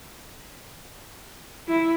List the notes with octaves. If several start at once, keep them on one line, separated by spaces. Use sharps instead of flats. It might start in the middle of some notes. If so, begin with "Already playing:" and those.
E4